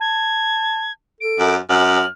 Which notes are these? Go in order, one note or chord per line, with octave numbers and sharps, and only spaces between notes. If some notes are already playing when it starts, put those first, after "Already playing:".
A5 G#6
A4 D7
F#2
F#2 F6 F#7